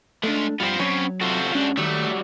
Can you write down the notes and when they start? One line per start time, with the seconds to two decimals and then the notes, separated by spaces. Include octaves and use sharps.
0.23 G#3 A3 D4 F4
0.60 G2 B3 C4 F4 C5
0.79 F#3 C#4 C#5
1.21 C3 F4 F#4 A4 C5
1.55 G#2 C#4 D4
1.77 D#3 F#3 G3 A3